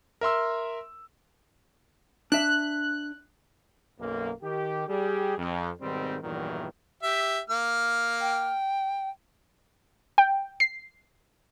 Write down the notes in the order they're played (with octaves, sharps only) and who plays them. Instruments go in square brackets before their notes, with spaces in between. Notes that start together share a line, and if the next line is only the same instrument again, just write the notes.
[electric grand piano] A#4 E5 C6 E6
[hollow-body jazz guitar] D4 E5 [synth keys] F#6
[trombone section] B1 F#2 A#3
D#3 G4
G3 G4 G#4
F2
G#2 B2 D#3 G3 C4
E2 G2 A#2 D#3 E3 F#3
[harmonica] G4 E5
A#3 F6
[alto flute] G5
[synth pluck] G5
C7